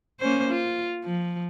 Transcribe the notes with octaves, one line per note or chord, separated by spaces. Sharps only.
A#3 C#4 C5
F4
F3